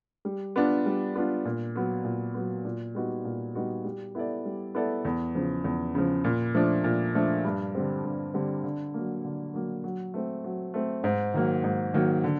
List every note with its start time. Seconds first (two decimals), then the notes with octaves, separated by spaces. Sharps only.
0.25 G3
0.56 B3 D4 F4
0.86 G3
1.15 B3 D4 F4
1.45 A#2
1.75 F#3 B3
2.05 A#2
2.35 F#3 B3
2.65 A#2
2.95 G3 B3 D#4 F#4
3.25 A#2
3.55 G3 B3 D#4 F#4
3.85 G3
4.15 B3 E4 A4 D5
4.45 G3
4.75 B3 E4 A4 D5
5.05 E2
5.35 C#3 F3
5.64 E2
5.95 C#3 F3
6.24 A#2
6.55 F3 A3 D4
6.84 A#2
7.15 F3 A3 D4
7.45 G2
7.75 D3 G3 C4
8.04 G2
8.34 D3 G3 C4
8.64 D3
8.94 F#3 A#3
9.25 D3
9.54 F#3 A#3
9.84 F#3
10.14 A3 C4
10.44 F#3
10.74 A3 C4
11.04 G#2
11.34 D#3 F#3 A#3
11.64 G#2
11.94 D#3 F#3 A#3
12.24 D3